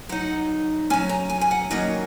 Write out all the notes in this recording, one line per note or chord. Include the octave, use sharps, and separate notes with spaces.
F#3 D#4 F#5
F#3 C#4 G#5
A#5
G#5
G#5
F#5
D#3 F#3 A#3 C#4 D#5